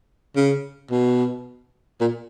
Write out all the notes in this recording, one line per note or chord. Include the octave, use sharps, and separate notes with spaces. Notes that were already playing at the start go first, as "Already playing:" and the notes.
C#3
B2
A#2